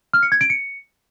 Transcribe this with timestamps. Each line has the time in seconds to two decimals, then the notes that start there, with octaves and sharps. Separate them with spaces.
0.13 F6
0.23 C#7
0.32 G#6
0.41 D7
0.50 C#7